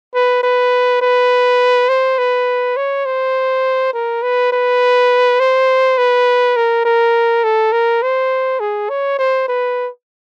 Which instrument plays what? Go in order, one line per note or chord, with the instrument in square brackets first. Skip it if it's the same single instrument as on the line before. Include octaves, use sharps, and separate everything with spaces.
[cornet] B4
B4
B4
C5
B4
C#5
C5
A#4
B4
B4
C5
B4
A#4
A#4
A4
A#4
C5
G#4
C#5
C5
B4